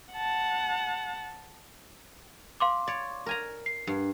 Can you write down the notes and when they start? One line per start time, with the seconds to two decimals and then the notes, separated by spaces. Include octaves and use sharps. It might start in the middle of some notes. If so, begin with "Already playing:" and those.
0.13 F#5 A5
2.60 F5 C6 D6
2.87 C#5 D5
3.26 A#4 G#5 A#5
3.66 C7
3.87 G2